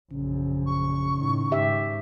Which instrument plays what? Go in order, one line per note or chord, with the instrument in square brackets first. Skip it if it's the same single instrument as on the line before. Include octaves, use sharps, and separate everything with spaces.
[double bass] A#1 F#2 [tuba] C#3
[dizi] C#6
[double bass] A2 D#3
[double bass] G#2 [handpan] G4 E5